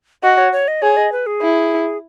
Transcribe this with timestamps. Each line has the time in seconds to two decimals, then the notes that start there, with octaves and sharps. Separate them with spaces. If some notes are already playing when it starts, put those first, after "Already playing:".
0.23 F#4 D#5
0.38 C#5
0.52 C#5
0.68 D#5
0.82 G#4 C#5
0.97 D#5
1.12 B4
1.26 G#4
1.42 E4